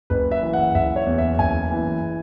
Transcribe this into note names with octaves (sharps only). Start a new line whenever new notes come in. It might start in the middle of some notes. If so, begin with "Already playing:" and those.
F#1 B4
E5
E3
F#5
F#1 E5
C#5
E2
E5
F#1 G#5
E3